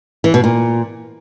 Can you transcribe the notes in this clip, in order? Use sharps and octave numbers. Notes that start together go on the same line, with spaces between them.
E3
B2
A#2